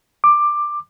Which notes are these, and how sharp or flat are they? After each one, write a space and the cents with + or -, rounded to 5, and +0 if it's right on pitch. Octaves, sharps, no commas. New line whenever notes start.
D6 +10